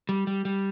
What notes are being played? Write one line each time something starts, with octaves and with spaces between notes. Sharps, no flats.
G3
G3
G3